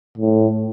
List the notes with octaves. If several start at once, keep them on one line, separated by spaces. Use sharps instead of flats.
A2